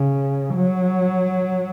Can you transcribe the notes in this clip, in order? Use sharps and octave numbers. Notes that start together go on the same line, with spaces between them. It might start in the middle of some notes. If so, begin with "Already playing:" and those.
Already playing: C#3
F#3